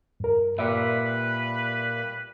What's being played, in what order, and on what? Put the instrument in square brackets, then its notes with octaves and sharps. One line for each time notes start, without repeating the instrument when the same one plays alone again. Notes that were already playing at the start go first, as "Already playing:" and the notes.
[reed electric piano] G2 A#4
[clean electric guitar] A#2 G3 [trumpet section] B4 [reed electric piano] E5